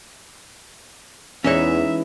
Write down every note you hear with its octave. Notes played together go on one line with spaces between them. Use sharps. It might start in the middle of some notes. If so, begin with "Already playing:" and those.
E2 E3 G#3 C#4 D#4 C#5 E5